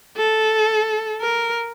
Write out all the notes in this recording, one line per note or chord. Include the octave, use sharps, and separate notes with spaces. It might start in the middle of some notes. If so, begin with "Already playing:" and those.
A4
A#4